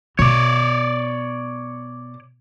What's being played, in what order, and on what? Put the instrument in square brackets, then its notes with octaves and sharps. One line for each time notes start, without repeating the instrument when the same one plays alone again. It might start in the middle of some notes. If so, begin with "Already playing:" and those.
[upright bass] B2 [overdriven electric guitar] C#5 D5